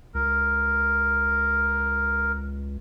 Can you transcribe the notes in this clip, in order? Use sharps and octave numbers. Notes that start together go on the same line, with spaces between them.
C#2 A#4